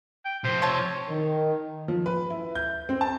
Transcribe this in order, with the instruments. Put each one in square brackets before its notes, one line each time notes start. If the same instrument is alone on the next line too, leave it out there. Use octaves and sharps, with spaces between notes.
[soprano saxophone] G5
[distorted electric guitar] C3 F3 [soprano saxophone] C5
[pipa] C4 A5 C6 [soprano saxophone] C#5
[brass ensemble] D#3
[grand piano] F3
B4
E4
G6
C4
A5